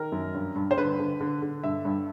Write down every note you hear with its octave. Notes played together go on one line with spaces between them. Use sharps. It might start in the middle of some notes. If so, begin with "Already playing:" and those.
Already playing: D#3 A#4
F#2
G2
G2
C5
D3 B4
D3
D3
D3
G2 E5
G2